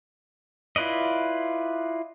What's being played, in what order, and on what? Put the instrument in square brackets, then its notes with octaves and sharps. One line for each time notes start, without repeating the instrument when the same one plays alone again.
[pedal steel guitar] E4 F4 B4 D5 D#5